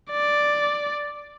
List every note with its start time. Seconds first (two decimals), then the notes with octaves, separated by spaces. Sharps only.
0.11 D5